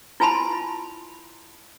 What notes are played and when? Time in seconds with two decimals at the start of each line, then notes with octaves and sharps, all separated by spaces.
0.20 E4 F4 G#5 A5 B5 C6